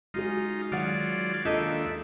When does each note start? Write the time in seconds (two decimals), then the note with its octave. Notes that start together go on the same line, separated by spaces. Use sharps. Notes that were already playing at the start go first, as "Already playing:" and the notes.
0.14 G#3 D#4 F4 F#4 G#4
0.72 D#3 F#3 G#3 F4 D5 F#5
1.45 D#2 D4 D#4 F4 G#4 A4 D#5 E5